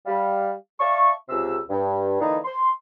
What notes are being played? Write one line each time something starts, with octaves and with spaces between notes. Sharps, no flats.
G3 F5
D5 E5 F5 A5 C#6
C#2 C3 E6
G2
D3 E3 A#3 D4 D#4
C6